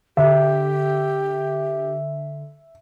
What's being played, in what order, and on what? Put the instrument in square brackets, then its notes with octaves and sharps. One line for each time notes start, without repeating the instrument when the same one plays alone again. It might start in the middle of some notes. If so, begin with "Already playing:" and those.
[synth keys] D3 [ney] G4 [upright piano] E5